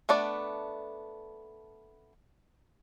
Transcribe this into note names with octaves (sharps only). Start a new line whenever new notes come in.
A3 B3 D4 D5